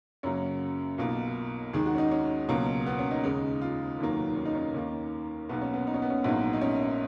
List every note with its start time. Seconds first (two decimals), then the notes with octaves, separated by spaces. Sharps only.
0.23 F#2 C#3 F#3 A#3 C#4
0.98 B1 B2 A#3 F4
1.73 D#2 D#3 G#3 G#4
1.86 F#4
1.95 C#4
1.98 D#4
2.11 C#4
2.49 C#2 B2 F#3 A#3
2.86 B3
2.99 C#4
3.11 D#4
3.24 D#2 C#3 G#3 D#4
3.62 F4
3.99 F1 D#2 D#3 F#3 A#3
4.36 C#4
4.45 D#4
4.55 C#4
4.74 D#2 D#3 A#3
5.49 B1 B2 A#3 B3
5.62 C#4
5.74 B3
5.87 D#4
5.94 C#4
6.02 B3
6.10 C#4
6.24 A#1 G#2 F#3 A#3 B3
6.53 D#4
6.61 C#4